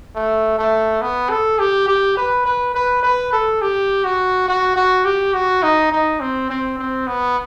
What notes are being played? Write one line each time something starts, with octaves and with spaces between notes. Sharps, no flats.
A3
A3
B3
A4
G4
G4
B4
B4
B4
B4
A4
G4
F#4
F#4
F#4
G4
F#4
D#4
D#4
C4
C4
C4
B3